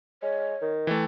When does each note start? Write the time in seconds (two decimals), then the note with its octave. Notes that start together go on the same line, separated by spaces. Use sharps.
0.22 G#3 C#5
0.62 D#3
0.87 E3 A3 G5